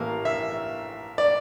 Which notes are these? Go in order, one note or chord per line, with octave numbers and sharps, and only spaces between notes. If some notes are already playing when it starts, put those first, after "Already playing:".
Already playing: A1 A2 E3 A#3 F5
E5
D5